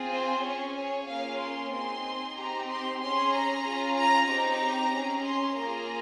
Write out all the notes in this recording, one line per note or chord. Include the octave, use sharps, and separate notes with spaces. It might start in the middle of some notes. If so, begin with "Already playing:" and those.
Already playing: C4 F4 G#4
C5
C#4 G#4 C#5
C#5
A#3 C#4 F4 G#4 F5
C6
C4 D#4 G#4 C6
C4 D#4 G4 A#5
C6
C#4 G#4 C6
A#5
C#4 F4 G#4
A#5
C4 D#4 G4 A#5
C#4 G#4
C6
A#3 F4 G#4 A#5